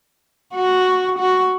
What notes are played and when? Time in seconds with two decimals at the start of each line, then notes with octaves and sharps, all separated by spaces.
0.55 F#4
1.19 F#4